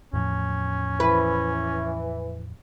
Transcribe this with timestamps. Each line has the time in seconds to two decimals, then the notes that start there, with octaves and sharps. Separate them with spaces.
0.13 E2 A2 F3 C#4
1.00 E3 B4